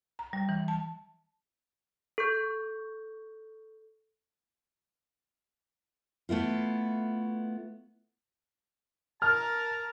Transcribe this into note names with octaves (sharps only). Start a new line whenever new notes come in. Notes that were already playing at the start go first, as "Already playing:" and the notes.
A#5
G3
E3
A5
A4 C#6 G6
A3 B3 E4 F4
A#4 A5 F6